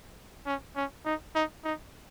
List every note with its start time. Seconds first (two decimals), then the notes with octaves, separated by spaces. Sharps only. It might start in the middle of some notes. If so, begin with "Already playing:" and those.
0.46 C#4
0.76 C#4
1.05 D#4
1.35 D#4
1.64 D#4